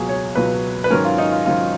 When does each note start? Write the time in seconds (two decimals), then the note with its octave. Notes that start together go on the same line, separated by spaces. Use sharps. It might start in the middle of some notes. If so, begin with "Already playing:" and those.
Already playing: C#2 B2 F#3 G#4
0.09 C#5
0.35 C#2 B2 F#3 B4
0.84 B4
0.90 G#2 D#3 F#3 C#4 A#4
1.05 F4
1.18 D#4
1.32 F4
1.46 G#2 D#3 F#3 C#4 F4